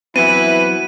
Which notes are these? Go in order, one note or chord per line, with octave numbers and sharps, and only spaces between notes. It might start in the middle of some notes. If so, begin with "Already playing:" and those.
E3 F#3 B3 C4 E4 B4 D#7